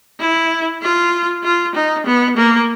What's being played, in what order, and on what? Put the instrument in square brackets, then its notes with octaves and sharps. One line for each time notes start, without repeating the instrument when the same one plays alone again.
[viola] E4
F4
F4
D#4
B3
A#3